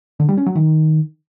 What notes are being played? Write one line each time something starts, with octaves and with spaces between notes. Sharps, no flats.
D3
G3
C#4
F#3
D#3